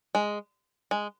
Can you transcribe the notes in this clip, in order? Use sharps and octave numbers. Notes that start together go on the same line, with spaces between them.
G#3
G#3